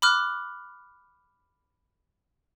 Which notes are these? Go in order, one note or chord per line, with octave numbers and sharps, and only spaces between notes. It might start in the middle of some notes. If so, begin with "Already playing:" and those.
B5 D6 F6 F#6